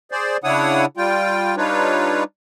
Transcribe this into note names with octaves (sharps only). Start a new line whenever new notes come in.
G#4 C5 D5
C#3 D4 E4 C#5 F#5 D#6
G3 F4 G5
G3 D4 D#4 F4 B4 C#5